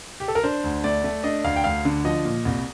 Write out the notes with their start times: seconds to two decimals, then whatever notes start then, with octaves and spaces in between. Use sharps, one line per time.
0.20 G4
0.28 A4
0.35 A#4
0.44 D4 C5
0.64 D2
0.84 A3 D5
1.04 A3
1.24 D4 D#5
1.44 D2 F5
1.56 G5
1.64 D2 F5
1.85 D3
2.05 F3 D#5
2.25 A#2
2.45 C2